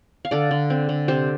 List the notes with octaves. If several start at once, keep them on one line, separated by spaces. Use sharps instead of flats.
F5
D3 A4 D5
D3
C4
D3
C3 G4 C5